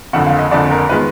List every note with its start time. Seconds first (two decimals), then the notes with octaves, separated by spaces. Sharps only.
0.13 F#1 F2 D3 F#5
0.26 F5
0.39 D#5
0.51 F#1 F2 D3 D5
0.71 A#4
0.89 D#3 G#3 B3 B4